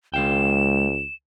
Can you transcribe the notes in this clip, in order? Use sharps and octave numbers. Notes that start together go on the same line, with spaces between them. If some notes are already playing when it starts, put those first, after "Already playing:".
C#2 G#3 F5 G5 E7